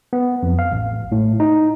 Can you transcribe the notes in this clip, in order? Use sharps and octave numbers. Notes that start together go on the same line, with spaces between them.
B3
F2
F5
A1
A2
D#4